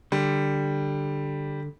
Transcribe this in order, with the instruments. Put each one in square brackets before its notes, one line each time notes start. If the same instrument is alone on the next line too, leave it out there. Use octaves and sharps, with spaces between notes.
[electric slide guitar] D3 [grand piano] G3